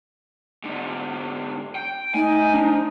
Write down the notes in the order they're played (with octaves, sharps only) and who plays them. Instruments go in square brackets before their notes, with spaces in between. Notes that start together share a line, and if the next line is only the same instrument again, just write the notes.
[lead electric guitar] G#2 D3
G5
[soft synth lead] A3 [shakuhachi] D#4 [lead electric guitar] G#5
[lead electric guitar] F3 [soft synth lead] D4